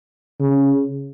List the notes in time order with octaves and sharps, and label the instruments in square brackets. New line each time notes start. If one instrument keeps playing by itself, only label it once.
[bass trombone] C#3